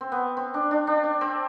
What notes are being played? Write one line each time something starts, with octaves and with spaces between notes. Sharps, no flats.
C4
B3
C4
D4
D4
D4
D4
C4